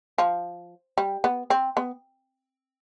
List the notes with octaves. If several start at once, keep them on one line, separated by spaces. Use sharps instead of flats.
F3
G3
B3
C4
B3